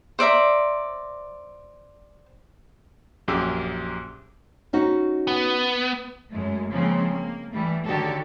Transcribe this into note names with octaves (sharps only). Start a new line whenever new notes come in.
C5 D5 E5 A#5
A#1 F#2 G4 G#4 D6 E6
C#4 D#4 F#4
B3
F#2 G#3 A3
C#3 F3 G#3 A#3 C4
A#3
E3 G3 A3
D3 D#3 F#3 F#4 G4 A4